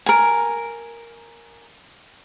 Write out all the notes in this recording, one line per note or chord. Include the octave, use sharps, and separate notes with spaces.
A#4 G#5